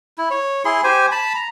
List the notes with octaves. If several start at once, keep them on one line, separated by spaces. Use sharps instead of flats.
E4
C#5
E4 G#4 C6
G4 C5 G#5
A5 B5
A#5